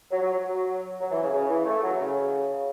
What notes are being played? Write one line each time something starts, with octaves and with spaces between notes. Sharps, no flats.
F#3
F#3
F#3
F#3
E3
C#3
C#3
E3
A3
F#3
C#3